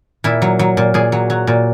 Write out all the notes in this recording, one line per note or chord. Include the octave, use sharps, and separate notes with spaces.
A#2 E4
F#3
F#3
A#2
A#2 G#4
F#3
F#3
A#2